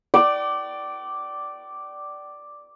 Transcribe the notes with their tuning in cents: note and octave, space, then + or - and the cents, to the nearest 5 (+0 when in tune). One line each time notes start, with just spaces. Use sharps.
D5 +0 G5 -40